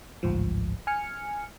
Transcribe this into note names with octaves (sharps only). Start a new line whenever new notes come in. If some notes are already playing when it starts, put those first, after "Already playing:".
A1 D2 G#2 F3
G#5 F6 C#7